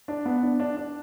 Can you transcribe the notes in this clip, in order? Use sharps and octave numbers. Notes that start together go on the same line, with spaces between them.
D4
B3
D4
D4
D4